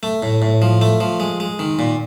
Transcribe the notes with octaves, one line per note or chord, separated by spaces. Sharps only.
A3
A2
A2
F3
A3
F3
G#3
G#3
D#3
A#2